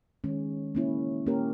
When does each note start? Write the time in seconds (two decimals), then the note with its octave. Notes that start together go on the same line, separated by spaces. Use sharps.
0.24 D#3 G#3 C#4
0.75 A#3 C#4 E4
1.27 A#3 C#4 G4 A#4